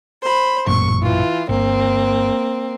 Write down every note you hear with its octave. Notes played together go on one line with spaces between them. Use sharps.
C5 B5
A1 F#2 A#2 C#6
E3 F4
G1 A#3 C4